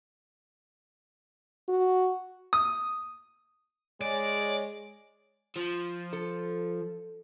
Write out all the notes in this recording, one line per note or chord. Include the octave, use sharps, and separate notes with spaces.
F#4
D#6
G#3 C#5 D5
F3
A4